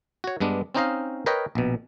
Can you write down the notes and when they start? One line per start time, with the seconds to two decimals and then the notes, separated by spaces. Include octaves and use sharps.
0.24 F#4 C#5
0.40 G2 G#3 B3 D4
0.75 C4 C#4 D#4 C5 D#5 F5
1.26 A#4 B4 C#5 D#5 G5
1.55 A#1 B2